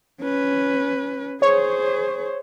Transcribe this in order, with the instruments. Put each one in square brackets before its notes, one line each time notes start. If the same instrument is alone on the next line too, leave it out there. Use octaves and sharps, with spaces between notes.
[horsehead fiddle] C#4 B4
[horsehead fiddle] G#4 C5 [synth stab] C#5